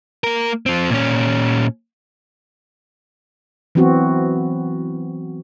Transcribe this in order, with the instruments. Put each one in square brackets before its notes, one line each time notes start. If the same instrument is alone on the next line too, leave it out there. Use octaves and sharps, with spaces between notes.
[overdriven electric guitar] A#3 A#4
F3 C4
A#2 C#4
[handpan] E3 F#3 B3 C4 F#4